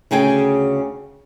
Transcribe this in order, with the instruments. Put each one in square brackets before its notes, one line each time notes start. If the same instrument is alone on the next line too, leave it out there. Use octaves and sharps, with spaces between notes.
[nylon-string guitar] D2 C#3 G#4 G5 G#5